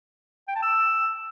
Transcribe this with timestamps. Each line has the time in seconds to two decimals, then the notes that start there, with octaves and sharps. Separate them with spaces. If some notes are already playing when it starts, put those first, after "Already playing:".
0.48 G5
0.55 A5
0.62 E6